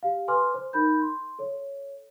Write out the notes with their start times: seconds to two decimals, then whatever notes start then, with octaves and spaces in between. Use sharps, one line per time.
0.03 G4 F5
0.28 A4 B4 G#5 C6 D6 F6
0.54 C5
0.73 D#4 A#4 B5 G6
1.01 C6
1.39 A4 C#5